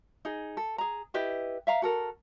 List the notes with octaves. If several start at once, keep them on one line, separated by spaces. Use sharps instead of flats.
D#4 G#4
A4
G#4 A#5
E4 G4 B4 D#5
E5 F5 A#5
F#4 A4 A#4